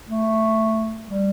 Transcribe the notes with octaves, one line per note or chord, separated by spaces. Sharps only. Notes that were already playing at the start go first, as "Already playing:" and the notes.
A3
G3